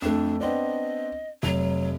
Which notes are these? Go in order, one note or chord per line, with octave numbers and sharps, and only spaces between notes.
F2 A3 D4
B3 C4 D4 D#5
F1 F#3 F7